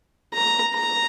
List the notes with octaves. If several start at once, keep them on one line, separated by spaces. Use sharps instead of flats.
A#5
A#5